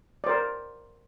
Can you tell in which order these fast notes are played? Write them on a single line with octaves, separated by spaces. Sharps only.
D5 C5 A#4